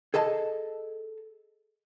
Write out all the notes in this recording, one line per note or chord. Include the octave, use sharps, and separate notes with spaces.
G#4 A4 D#5 A5